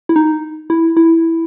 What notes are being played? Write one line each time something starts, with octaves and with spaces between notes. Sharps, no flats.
E4
D#4
E4
E4